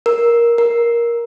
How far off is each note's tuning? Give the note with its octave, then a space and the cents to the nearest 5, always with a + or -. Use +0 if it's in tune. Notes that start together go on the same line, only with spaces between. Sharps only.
A#4 +10
A#4 +10